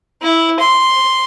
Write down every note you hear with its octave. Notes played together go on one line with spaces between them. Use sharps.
E4
C6